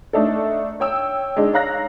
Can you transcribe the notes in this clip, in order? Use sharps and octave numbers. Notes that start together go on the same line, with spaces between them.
A3 D4 D#4 A4
C#5 G5 E6
G#3 D4 D#4
C#5 F5 A#5 F#6 A#6